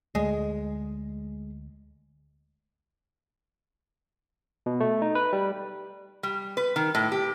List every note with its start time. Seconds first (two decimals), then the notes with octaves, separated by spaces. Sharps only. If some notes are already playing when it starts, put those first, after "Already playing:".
0.15 D2 G#3
4.66 B2
4.80 A3
5.02 D#4
5.15 B4
5.33 G3
6.23 G3
6.57 B4
6.76 D#3
6.95 A2
7.12 G4